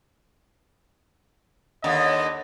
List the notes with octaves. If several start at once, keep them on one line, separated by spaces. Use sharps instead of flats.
D#2 D3 D#5